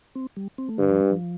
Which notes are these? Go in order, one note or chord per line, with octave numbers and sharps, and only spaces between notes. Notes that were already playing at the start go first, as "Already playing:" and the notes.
C4
G3
C4
A3
G2 D3
F3
G3
F3